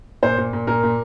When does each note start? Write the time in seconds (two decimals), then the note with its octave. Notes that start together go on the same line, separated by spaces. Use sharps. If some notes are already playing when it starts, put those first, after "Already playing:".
0.23 A#2 C5
0.38 A#2
0.53 A#2
0.67 A#2 A#4
0.83 A#2